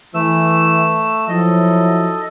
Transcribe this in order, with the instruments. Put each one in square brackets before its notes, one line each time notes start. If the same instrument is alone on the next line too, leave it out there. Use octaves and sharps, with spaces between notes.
[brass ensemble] E3 [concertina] A3 E6
[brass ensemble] F3 F#3 E4 [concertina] A4 D#5